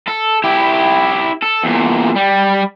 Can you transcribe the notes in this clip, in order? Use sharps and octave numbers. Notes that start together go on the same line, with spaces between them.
A4
E4 G4
A4
E2 A#2
G3